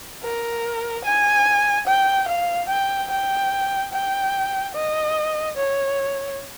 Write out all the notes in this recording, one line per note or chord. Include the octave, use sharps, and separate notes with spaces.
A#4
G#5
G5
F5
G5
G5
G5
D#5
C#5